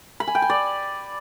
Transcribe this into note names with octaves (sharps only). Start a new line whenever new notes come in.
B5
G#5
G5
G#5
D5